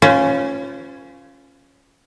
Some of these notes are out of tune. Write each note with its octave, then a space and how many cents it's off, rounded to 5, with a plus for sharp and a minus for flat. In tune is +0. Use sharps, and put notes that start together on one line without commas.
C#4 +0 F4 +0 C5 -40